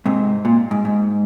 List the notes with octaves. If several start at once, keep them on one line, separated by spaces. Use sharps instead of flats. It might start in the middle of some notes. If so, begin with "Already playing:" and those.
G#2 C3
A#2
G#2
G#2